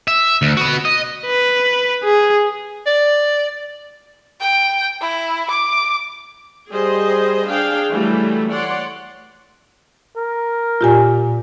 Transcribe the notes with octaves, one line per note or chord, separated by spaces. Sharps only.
E5
D2
B3 F#4
D#5
B4
G#4
D5
G5
E4
D6
G3 G#4 C5 D#5
D4 G#4 F5 G5
E3 F#3 G3 A3 E4
C#5 D5 F#5 C6
A#4
A#2 F4 G4 G#5